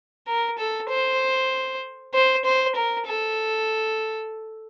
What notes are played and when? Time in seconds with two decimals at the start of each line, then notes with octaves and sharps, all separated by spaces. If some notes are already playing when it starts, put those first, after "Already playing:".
0.27 A#4
0.59 A4
0.90 C5
2.14 C5
2.45 C5
2.76 A#4
3.07 A4